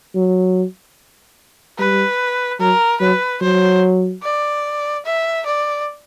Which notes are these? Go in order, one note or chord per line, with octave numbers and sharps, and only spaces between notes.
F#3
G3 B4
F#3 A#4
F#3 B4
F#3 C5
D5
E5
D5